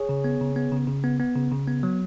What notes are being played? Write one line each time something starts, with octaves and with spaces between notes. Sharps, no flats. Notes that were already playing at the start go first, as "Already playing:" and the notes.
Already playing: G#4 C#5
C#3
B3
C#3
B3
C#3
C#3
B3
B3
C#3
C#3
B3
F#3